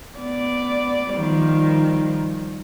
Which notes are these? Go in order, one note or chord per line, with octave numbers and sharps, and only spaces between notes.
B3 D5
D#3 F3 G3